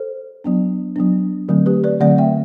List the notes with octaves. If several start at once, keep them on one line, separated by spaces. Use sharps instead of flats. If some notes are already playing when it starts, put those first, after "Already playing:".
Already playing: A4 C5
F#3 B3 D4
F#3 B3 D4
D3 F#3 A3 C4
G4 B4
B4 D5
D3 F#3 A3 C4 D5 F#5
E5 G5